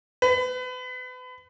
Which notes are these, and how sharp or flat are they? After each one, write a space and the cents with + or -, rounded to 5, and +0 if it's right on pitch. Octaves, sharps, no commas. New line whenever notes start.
B4 +35